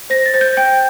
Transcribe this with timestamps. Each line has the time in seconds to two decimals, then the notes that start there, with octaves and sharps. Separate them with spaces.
0.10 C5 A#6
0.26 A6
0.34 C5
0.41 G6
0.57 G5 G6